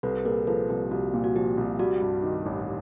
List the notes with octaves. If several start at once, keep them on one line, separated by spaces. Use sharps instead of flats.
C2 A4 B4
A#2 G#4 A#4
F3 A4 B4
C2 G4
C2 F#4
A#2
F#4
F3 G4
C2
G3 F#4
G2
D#3
A1